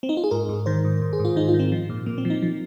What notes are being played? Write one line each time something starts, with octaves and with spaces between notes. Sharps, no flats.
C4
D#4
F4
G#4
G#2 A#4
G#2
D#3 C5
G#2
G#2
G#4
G#2
F4
D#3 D#4
F4
D#3
C4
F3
A#2
A#2 A#3
C4
F3
D#4
F3